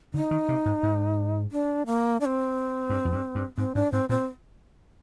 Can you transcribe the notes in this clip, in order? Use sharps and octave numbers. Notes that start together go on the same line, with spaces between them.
D3 D#4
D#3
C3
G#2
G#2
D4
A#3
D4
C4
G2
F2
G2
G2
G#2 C4
G#2 D4
G#2 C4
A#2 C4